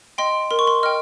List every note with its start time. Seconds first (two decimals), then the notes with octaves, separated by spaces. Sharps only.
0.18 D#5 G5 C6
0.51 A#4 C6
0.59 C#6
0.67 C6
0.83 D#5 G5 F6